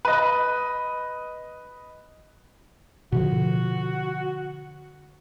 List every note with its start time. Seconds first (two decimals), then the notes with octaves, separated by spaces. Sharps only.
0.05 B4 D#5
3.12 B2 D3 F3 F#4